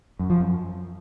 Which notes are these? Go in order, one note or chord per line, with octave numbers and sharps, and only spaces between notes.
F#2
F3
F#2